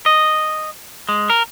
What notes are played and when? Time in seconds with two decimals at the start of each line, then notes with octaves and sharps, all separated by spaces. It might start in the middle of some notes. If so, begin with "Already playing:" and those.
0.06 D#5
1.09 G#3
1.30 A#4